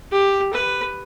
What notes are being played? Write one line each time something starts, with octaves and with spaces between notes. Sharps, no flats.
G4
B4